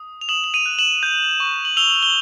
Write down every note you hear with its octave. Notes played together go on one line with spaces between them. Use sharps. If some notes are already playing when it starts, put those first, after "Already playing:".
Already playing: D#6
F7
D#6 E7 F#7
F#7
D#7 F7
F#6
E7 F#7
G6
C#6
F#7
E6 F7 G7
G7